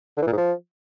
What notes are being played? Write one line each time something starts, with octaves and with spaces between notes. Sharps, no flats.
D3
E3
A#2
G#2
F3